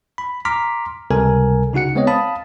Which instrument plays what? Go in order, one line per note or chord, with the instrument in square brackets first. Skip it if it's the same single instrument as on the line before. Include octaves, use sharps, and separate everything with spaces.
[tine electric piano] B5
A#5 C6 D6 F6 B6
C#2 C3 G3 A4 A#4 G#5
C#3 D#4 F#4 F#5 C#7
G#3 B3 C4 C#5 D#5
F5 A5 B5 D#6